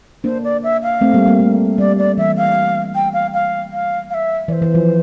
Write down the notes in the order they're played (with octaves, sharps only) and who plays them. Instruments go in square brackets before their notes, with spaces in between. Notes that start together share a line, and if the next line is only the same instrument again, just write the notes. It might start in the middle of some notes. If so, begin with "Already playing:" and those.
[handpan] A#3 D4 [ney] C5
[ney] D5
E5
F5
[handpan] A3 C4
G3 A#3
G3 A#3
A3
[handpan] G3 [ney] D5
[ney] D5
[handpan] E3 [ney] E5
[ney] F5
G5
F5
F5
F5
F5
E5
[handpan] E3 [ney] D5
[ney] C5
[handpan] E3
F3